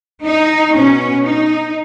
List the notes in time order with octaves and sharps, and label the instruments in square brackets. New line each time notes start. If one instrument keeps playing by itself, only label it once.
[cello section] D#4
B2 C#4
D#4